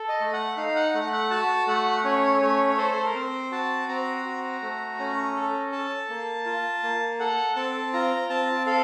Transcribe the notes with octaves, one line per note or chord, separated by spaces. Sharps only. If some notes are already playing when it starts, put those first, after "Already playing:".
Already playing: A4
D#5
A3
F#5
D#4 F5
F#5
A3 F#5
F#5
F#4 A5
A3 F#5
C#4 C#5
A3 C#5
C#5
A4 C5
A4
A#4
C4 C5
F#4 A5
C4 A#5
F#4
A3
C#4
A4
A4 A5
A#3
F4
A#3
A4 F#5
C4 A5
F4 A#5
C4 A5
A4 F5